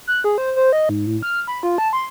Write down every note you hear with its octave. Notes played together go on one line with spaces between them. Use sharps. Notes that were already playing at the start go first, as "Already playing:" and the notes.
F#6
G#4
C5
C5
D#5
G#2
A2
F6
B5
F4
A5
C6